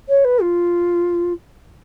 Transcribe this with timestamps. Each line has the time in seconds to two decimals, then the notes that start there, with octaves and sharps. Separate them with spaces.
0.09 C#5
0.24 B4
0.42 F4